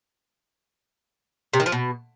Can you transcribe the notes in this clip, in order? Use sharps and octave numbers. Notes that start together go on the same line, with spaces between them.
C3
D#3
F3
B2